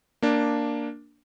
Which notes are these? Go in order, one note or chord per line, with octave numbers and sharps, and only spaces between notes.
A#3 D4